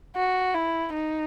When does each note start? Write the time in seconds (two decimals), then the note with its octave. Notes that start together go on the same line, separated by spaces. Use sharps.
0.16 F#4
0.54 E4
0.94 D#4